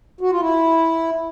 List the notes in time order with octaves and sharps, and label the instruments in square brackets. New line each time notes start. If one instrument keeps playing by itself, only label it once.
[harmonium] F#4
F4
E4